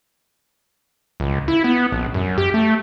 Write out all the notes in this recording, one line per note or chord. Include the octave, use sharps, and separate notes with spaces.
C#2
E4
B3
A#1
F#2
G4
A3